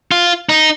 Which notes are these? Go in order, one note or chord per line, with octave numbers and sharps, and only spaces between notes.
F4
D#4